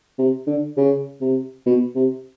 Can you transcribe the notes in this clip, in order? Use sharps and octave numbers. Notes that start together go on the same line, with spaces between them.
C3
D3
C#3
C3
B2
C3